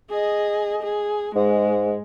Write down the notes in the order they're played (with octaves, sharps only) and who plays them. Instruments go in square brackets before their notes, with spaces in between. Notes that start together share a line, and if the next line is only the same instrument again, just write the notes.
[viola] G#4 D#5
G#4
[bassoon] G#2 [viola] G#3